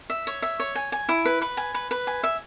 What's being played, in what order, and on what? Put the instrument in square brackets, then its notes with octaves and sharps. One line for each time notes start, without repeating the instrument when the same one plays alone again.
[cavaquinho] E5
C#5
E5
C#5
G#5
G#5
E4
B4
B4
G#5
B4
B4
G#5
E5